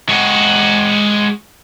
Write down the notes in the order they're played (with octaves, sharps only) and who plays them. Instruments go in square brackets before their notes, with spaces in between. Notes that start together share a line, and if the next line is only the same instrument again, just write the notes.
[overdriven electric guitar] G#3 F#4